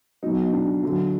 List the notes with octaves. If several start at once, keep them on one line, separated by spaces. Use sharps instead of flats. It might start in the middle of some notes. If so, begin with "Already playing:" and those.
B2 F#3 D#4
D4
D3 F#3